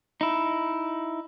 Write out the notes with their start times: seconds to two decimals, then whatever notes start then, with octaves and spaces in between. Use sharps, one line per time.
0.21 D#4 E4